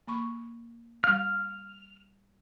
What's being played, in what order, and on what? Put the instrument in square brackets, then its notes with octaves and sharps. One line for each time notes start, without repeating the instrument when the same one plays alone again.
[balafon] A#3 B5 C#6
[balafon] G3 F5 [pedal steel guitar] F6